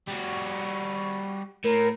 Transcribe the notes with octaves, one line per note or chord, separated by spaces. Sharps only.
G3 F#4
A2 A#4